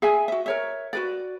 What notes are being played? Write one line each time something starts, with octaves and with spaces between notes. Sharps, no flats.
G#4 E5 G#5
F#4 E5
A#4 C#5 E5
F#4 B4 D5